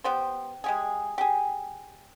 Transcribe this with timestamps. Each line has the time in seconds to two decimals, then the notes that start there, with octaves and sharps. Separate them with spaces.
0.04 B3 G4 C5
0.64 G#3 G4 G#4
1.18 G4 G#4